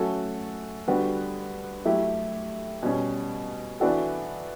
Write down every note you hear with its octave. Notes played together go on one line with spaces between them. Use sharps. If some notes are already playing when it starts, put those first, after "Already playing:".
Already playing: F#3 A3 C#4 F#4 A4
D3 G3 B3 F#4
F#3 A3 E4 G4
B2 G3 C#4
E3 B3 D4 F#4 A4